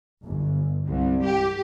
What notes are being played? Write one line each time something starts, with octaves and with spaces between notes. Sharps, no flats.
G1
C2
G4